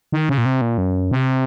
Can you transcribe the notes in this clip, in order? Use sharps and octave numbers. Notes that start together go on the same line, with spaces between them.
D#3
C#3
A#2
C3
A#2
F#2
C3